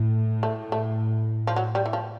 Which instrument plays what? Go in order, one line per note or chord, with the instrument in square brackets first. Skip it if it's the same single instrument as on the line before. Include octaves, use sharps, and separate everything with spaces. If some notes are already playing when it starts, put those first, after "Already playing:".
Already playing: [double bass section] A2
[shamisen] A3
A3
F3
F#3
G3
E3
F3